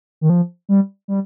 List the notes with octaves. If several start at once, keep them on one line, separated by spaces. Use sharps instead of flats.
D#3
F3
G3
G3